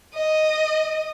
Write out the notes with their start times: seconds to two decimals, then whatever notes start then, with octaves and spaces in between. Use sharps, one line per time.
0.14 D#5